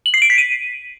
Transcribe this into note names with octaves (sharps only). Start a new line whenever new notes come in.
F#7
C7
D7
B6
D#7